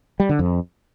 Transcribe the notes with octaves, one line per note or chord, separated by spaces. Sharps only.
G3
D3
F2